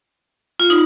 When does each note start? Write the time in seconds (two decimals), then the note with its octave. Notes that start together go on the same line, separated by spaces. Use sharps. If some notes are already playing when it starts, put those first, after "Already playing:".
0.60 F4
0.70 D#4